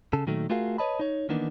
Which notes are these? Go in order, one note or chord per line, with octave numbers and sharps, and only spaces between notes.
C#3 A4
A#2 D#3 F#3 A3
A3 F4 F#4 G#4 A#4 F5
B4 C#5 D#5 A5 B5
D#4 C#5
D#3 E3 A#3 B3 D4 D#4